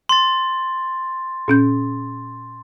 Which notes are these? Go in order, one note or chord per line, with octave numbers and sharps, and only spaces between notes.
C6 A6
A#2 C#4 G6